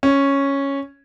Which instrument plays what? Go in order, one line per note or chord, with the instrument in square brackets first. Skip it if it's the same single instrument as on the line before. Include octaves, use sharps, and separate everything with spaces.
[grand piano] C#4